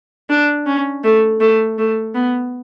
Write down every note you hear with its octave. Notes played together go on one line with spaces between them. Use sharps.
D4
C#4
A3
A3
A3
B3